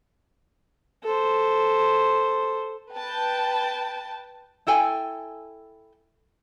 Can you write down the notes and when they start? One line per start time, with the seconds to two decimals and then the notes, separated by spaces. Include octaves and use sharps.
1.04 A4 C5
2.94 B4 G5 A5
4.67 E4 A4 G5 G#5